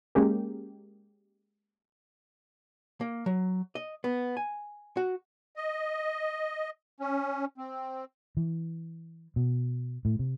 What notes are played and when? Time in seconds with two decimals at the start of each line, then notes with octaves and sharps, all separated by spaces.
0.15 G#3 A#3 C#4 G4 G#4 A#4
3.01 A#3
3.26 F#3
3.75 D#5
4.04 B3
4.37 G#5
4.97 F#4
5.56 D#5
7.00 C#4
7.58 C4
8.37 E3
9.36 B2
10.05 A2
10.19 C3